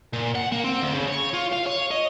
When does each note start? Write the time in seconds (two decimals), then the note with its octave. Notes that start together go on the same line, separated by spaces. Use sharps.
0.13 A#2
0.35 F#5
0.52 A#3
0.64 C4
0.81 D2
0.94 C#3
1.08 C#5
1.34 F4
1.53 F5
1.67 C#5
1.91 D#5